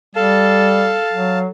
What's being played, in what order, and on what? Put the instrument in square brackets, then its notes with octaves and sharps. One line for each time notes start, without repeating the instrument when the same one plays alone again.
[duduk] G3 [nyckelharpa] A4 [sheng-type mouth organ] F5 A5
[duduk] F#3